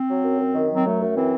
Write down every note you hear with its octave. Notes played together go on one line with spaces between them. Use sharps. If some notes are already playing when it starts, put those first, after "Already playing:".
Already playing: C4
F#3
F#2
F#2
D#3
F#3 C4
F#2 A3
F#2
E3 C4